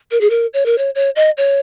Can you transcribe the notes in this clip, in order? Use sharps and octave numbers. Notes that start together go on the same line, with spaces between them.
A#4
G#4
A#4
C#5
A#4
C#5
C#5
D#5
C#5